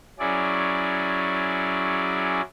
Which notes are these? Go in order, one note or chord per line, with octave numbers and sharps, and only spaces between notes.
F#3 C#4 E4 G#4 D5